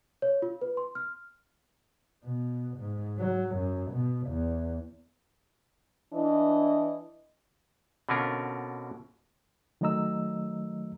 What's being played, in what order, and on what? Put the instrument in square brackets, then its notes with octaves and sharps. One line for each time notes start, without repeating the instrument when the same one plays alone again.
[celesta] C#5
F4
B4
C6
F6
[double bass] B2
G#2
F#3
F#2
B2
E2
[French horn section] E3 D4 E4 D#5
[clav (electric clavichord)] B2 D3 C4 C#4 F4 A#4
[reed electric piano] D#3 F#3 A3 D#5 A#5 E6